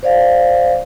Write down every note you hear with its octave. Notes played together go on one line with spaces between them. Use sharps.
C5 D5 F5